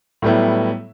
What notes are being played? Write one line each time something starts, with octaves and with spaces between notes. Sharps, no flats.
A2 F#3 G3 A3 B3 E4